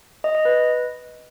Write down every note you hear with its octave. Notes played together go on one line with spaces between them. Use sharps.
D#5
D#5
B4